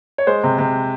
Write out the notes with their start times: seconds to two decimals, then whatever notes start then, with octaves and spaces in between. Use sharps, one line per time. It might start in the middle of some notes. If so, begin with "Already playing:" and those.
0.18 C#5
0.27 G#3 C5
0.44 C3
0.58 C3